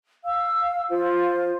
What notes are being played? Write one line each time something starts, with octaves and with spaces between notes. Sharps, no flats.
F5 E6
F4 C5